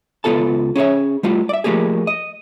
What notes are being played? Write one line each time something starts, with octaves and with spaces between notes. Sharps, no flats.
C#2 D#3 B3 F4 A4 A5
C#4 G#4 C#5 E5
G3 A3 F4
D5 E5
F3 A3 A#3 G4 G#4
D#5